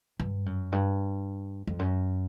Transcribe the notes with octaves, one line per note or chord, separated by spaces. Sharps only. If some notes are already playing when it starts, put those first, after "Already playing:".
G2
F#2
G2
F2
F#2